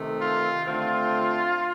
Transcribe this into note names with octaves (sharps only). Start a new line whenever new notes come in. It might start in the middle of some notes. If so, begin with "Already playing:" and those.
Already playing: C3 D#3 A3
F4
D3 A3 C4 F4